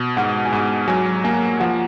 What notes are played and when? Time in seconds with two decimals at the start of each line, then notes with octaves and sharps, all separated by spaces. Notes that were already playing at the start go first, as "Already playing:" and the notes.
Already playing: B2
0.17 G#2 F#5
0.45 G#5
0.52 G#2 F#5
0.88 F#3 G#5
1.24 A#3 G#5
1.60 F3 F#5